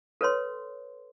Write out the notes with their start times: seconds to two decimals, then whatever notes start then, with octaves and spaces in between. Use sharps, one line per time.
0.21 A4 B4 C#5 C6